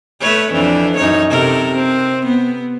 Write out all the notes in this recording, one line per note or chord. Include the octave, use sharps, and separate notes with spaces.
A3 B4 C#5
F2 E3 D4
F#2 D#4 C#5
C3 A4 A#4
C4
B3